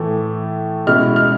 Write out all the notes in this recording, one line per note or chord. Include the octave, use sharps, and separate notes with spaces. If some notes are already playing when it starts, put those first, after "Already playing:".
Already playing: A2 E3 A3
B2 G#3 C#4 E4 F6
F6